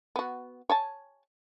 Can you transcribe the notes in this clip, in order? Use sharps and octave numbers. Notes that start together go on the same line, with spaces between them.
B3 F#4
C#5 G#5 A5